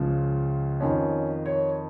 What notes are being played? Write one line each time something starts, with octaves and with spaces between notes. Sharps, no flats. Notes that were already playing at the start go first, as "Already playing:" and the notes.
Already playing: C#2 C#3 F3
F2 D#3 C#4
C#5